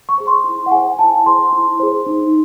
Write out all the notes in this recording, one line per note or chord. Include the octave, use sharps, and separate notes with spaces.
C#6
G#4 C5
C6
E4
F#5
G#4 C5 G#5
E4 A5
G#4 C5 C6
E4
G#4 C5
D#4